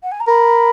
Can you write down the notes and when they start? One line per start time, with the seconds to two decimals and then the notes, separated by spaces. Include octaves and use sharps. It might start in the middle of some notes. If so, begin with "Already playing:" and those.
0.03 F#5
0.11 G#5
0.20 A#5
0.28 A#4 B5